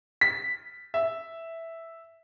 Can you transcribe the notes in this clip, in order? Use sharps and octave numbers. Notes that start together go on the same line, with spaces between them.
B6
E5